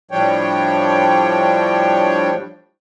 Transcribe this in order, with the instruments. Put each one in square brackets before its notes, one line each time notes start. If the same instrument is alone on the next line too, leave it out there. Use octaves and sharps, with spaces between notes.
[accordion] A2 F3 G3 D4 C#5 G5